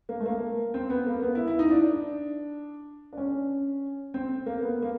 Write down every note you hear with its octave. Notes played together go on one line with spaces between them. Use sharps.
A#3
A3
A#3
C4
B3
A#3
B3
E4
E4
D#4
D4
D4
C#4
C4
A#3
B3
A#3